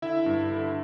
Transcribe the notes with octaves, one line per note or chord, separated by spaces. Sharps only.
D3 E4 E5
G2
D3